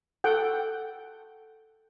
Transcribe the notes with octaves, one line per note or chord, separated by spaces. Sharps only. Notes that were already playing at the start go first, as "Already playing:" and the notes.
A4 F#5 G5